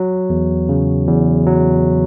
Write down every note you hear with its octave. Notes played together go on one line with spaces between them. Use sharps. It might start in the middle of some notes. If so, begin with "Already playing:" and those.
Already playing: F#3
E2
C#3
E2
F#3